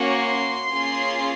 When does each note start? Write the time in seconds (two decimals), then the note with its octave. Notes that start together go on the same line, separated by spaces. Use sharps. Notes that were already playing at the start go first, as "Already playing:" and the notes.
Already playing: A#3 C#4 F#4
0.20 C6
0.74 A#3 C#4 F4 G#4